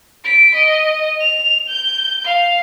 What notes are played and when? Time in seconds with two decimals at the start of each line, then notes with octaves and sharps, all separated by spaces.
0.24 B6 D7
0.55 D#5
1.20 F7
1.68 G6
2.24 F5